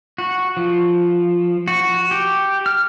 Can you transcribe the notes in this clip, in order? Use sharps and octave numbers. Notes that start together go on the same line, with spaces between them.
F#4
F3
F#4
G4
F6